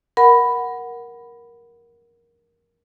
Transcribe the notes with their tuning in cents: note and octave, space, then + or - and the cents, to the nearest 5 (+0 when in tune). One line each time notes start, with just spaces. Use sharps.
A#4 +10 F#5 +0 B5 +5